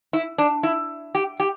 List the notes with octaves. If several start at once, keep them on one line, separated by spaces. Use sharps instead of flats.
E4
D4
E4
G4
G4